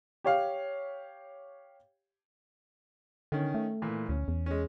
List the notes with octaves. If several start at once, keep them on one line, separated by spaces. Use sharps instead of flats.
G4 C#5 F5
D3 D#3 C#4
A3
A#2 E3
D2 C#4
E2
G#3 C#4